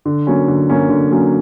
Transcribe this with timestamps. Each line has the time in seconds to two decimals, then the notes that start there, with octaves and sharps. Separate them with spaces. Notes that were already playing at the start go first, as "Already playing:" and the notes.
0.05 D3
0.27 F#3 A#3 C#4
0.48 D3
0.69 F#3 A#3 C#4
0.89 D3
1.11 F#3 A#3 C#4